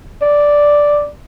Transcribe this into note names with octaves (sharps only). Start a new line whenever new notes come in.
D5